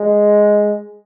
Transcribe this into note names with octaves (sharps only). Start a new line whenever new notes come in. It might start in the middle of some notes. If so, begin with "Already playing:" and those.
Already playing: G#3